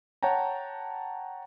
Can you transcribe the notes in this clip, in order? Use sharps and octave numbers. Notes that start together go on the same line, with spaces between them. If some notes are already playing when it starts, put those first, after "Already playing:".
C#5 F#5 G5 A5 A#5